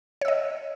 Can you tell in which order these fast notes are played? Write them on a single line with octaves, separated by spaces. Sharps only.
C#5 E6 D#5